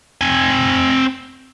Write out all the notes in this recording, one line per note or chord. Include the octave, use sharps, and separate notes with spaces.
C4 G#5